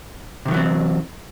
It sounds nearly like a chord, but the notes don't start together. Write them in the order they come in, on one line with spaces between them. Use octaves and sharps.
C3 D#3 F#3 E3 C4